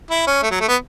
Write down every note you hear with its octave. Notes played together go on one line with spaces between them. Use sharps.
E4
C#4
A3
F#3
A3
B3